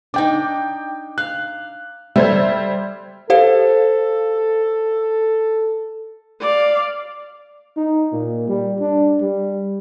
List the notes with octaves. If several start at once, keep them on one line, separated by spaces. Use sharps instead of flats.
D4 D#4 G5 D6
F5 F#6
G3 A4 C5 E5 G#6
G4 A4 C5 F5
D5 F5
D#4
A#2
G3
D4
G3